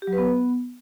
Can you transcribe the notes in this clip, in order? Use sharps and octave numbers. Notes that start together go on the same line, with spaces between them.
G4
F#3
B4
B3